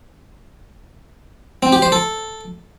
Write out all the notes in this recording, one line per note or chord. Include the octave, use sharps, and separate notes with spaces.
C4
G4
C5
A4